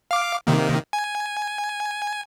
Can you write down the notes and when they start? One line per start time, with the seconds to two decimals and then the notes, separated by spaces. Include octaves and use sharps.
0.11 F5 D6
0.47 C3 D#3 A#3
0.93 G#5